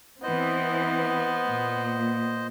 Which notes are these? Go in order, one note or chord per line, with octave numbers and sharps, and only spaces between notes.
E3 B3 C4 C5 D#5
A#2